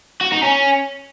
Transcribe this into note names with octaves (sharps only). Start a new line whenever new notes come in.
F#4
D#4
C#4